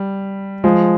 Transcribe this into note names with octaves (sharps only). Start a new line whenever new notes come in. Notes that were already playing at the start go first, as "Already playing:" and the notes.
Already playing: G3
F3 G#3